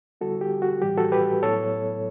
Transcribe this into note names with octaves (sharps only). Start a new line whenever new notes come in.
D3 G3 B3 E4 F#4 A4
G4
F#4
A2 E3 G3 G4
F#4 A4
G4 B4
A2 F#3 B3 E4 A4 C#5